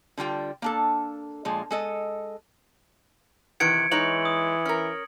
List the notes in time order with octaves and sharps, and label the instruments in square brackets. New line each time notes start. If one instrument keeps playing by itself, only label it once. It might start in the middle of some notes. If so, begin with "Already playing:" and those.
[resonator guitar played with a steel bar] D3 G3 F4 G5
A#3 D4 A4
A#2 F3 G#3
G#3 A4 D#5
[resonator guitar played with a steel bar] C3 D#3 E3 [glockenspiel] G#6 C#7 D7
[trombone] E3 [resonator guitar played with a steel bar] G#3 D#4 C#5 [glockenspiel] F#7
[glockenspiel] D#6
[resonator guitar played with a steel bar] C#4 A#4